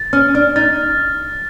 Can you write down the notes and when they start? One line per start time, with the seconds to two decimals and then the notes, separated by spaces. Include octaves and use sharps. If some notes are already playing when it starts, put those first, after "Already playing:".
Already playing: A6
0.13 C#4 F6
0.35 D4 F6
0.56 D#4 A6